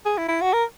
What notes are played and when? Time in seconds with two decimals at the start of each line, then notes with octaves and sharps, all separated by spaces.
0.05 G#4
0.18 E4
0.28 E4
0.42 F#4
0.53 A#4